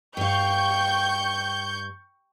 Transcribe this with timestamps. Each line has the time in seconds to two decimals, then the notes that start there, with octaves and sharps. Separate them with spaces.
0.17 G2 F5 G5 C#6 G6